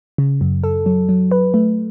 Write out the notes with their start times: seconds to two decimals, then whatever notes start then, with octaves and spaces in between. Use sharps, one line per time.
0.18 C#3
0.41 F#2
0.63 A4
0.86 F#3
1.09 F#3
1.31 B4
1.54 A3